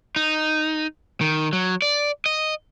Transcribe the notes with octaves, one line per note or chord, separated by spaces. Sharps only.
D#4
D#3
F#3
D5
D#5